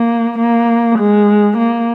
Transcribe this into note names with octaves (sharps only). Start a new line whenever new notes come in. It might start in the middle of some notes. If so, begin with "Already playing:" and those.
Already playing: A#3
A#3
G#3
A#3